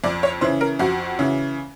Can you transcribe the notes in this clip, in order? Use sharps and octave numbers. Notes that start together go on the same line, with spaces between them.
F2 D5
C#5
C#3 E3 C5
A#4
F2 F#4
C#3 E3